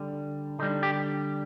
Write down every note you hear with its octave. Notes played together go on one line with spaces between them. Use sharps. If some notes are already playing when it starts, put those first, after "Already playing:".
Already playing: D3 G3
D3 G3 D#4
G4